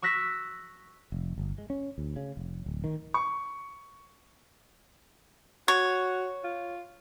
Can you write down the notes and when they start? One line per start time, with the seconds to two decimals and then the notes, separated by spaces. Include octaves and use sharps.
0.02 C#6 E6 F#6 A#6 B6 E7
1.12 F1
1.38 G1
1.58 G#3
1.70 C#4
1.98 D2
2.16 C#3
2.37 F1
2.66 D1
2.84 D#3
3.14 C#6
5.68 F#4 C#5
6.44 F4